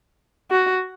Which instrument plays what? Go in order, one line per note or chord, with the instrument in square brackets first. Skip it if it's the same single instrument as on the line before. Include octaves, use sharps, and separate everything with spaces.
[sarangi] F#4